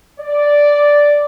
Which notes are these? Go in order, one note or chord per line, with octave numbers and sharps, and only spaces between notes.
D5